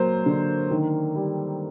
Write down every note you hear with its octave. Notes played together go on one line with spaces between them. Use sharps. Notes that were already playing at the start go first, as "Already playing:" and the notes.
Already playing: F#3 A#3 C5
D3
D#3
G3